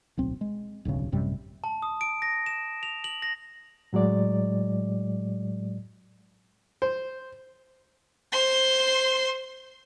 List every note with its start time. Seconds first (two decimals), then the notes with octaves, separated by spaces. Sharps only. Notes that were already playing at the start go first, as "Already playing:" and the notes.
0.17 D1 B1 C4
0.41 G#3
0.85 D1 B1 G2 C#3
1.12 A1 F#2 C3 G3
1.64 A5
1.82 D#6
2.01 D7
2.22 A#6
2.46 E7
2.83 F7
3.04 F#7
3.22 A#6
3.93 A2 F#3 G#3 D5
6.82 C5
8.32 C5 C6